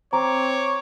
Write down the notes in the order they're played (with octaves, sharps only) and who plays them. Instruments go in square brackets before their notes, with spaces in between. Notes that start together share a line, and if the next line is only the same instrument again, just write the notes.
[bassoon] C4 [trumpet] C#5 [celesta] A#5 [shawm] D6